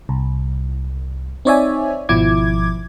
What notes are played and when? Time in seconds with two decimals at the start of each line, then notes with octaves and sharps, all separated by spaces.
0.09 C2
1.45 C4 D#4 C#5 D5 E5 G#5
2.09 G#1 B2 F3 E4 D6 G#6